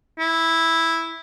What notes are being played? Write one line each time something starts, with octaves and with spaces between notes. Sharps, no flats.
E4